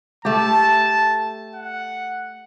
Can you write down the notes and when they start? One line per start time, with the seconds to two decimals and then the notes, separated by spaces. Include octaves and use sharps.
0.25 A3 G4 A5
1.55 F#5